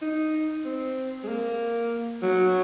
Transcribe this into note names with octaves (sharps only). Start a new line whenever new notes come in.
D#4
C4
G#3
A#3
F#3